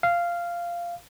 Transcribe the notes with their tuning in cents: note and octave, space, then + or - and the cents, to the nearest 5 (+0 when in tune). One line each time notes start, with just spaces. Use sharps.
F5 -10